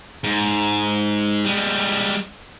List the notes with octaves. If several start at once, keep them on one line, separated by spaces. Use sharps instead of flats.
G#2
G3 G#3